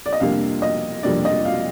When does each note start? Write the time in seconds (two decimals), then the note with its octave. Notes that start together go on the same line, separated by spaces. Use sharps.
0.06 D5
0.13 D#5
0.20 F2 C3 G3 A#3 D4 F5
0.62 D#5
1.03 F2 C3 G3 A#3 D4 D5
1.25 D#5
1.45 F5